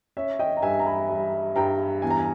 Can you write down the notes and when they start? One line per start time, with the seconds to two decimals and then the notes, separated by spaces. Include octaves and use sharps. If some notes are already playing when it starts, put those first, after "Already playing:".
0.17 C#4 E5
0.39 D#5 G5
0.57 A#5
0.62 G2 E5 G#5
0.79 A#5
0.86 G#5 B5
1.09 G3
1.56 G2 G5 A#5
2.02 E2 G#5
2.10 A#5
2.18 G#5